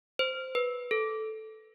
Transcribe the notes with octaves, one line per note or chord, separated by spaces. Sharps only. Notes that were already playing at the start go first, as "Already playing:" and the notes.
C5
B4
A4